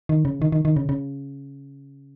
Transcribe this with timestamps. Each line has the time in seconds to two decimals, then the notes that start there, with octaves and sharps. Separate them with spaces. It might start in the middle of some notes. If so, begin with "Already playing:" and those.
0.09 D#3
0.25 C#3
0.42 D#3
0.52 D#3
0.65 D#3
0.76 C#3
0.89 C#3